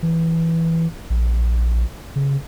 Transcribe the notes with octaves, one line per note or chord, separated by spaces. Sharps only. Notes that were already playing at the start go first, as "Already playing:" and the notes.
E3
A#1
C#3